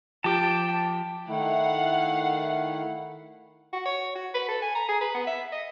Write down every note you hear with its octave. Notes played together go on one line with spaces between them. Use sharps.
F3 G4 G5 A5 D6
D#3 A3 E4 F5 F#5
F#4
C#5
F#4
B4
A4
G#5
A#5
G#4
B4
B3
E5
D#5